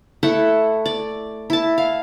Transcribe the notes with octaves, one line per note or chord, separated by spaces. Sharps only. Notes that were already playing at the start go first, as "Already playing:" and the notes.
A3 E4 A4 F#5
D5
E4 A5
F5